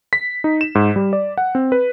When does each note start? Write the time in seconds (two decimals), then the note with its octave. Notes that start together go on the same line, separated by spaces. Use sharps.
0.13 B6
0.44 D#4
0.61 E7
0.75 G#2
0.96 G3
1.13 D5
1.38 F#5
1.55 C4
1.72 B4